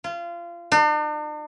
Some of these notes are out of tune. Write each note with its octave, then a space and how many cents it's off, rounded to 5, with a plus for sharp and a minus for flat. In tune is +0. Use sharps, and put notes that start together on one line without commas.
F4 -25
D4 +45